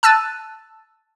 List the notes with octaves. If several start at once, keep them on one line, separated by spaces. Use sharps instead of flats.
A5 E6 F#6 A6 D#7